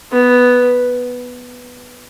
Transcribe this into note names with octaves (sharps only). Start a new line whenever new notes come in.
B3